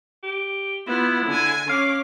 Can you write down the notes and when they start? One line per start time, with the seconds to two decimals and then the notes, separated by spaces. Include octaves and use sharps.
0.23 G4
0.87 B3 E4 F4
1.26 D3 G#5
1.69 C#4 F5 D6